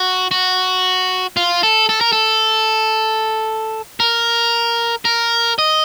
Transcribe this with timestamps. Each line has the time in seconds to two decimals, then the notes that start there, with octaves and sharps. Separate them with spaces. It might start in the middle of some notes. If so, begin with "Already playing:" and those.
Already playing: F#4
0.31 F#4
1.37 F4
1.63 A4
1.89 A4
2.01 A#4
2.13 A4
4.00 A#4
5.05 A#4
5.59 D#5